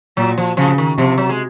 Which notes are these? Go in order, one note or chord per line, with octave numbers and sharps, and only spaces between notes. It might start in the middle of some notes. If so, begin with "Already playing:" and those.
A#2 F#3
F3
C#3 F3
D#3
C3 F3
F#3
G#3